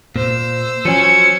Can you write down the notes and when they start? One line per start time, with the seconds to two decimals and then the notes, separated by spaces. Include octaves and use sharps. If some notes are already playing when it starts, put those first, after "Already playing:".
0.16 A#2 C5 E6
0.85 F3 F#3 C#4 C#7